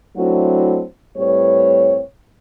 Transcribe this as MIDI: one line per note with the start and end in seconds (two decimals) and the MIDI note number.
0.17 0.82 54
0.17 0.82 57
0.17 0.82 60
0.17 0.82 62
0.17 0.82 64
0.17 0.82 66
1.17 2.00 45
1.17 2.00 55
1.17 2.00 60
1.17 2.00 71
1.17 2.00 73